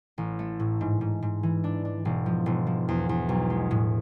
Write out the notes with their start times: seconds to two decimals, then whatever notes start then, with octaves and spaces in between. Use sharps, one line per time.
0.18 A1
0.39 A3
0.60 A2
0.81 G#2
1.01 G#2
1.22 G#2
1.43 E3
1.64 D4
1.85 D4
2.05 E1
2.26 F3
2.46 E1
2.67 F3
2.89 E2
3.09 E2
3.29 B1
3.50 G#3
3.71 A2